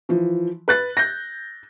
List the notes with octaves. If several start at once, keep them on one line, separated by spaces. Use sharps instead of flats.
E3 F3
B4 F#6 A6
G6 A#6